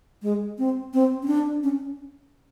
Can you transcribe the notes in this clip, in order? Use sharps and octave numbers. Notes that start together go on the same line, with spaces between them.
G#3
C4
C4
C#4
D4
C#4